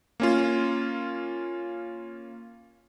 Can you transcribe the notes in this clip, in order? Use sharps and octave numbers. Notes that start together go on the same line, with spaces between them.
A#3 C#4 F4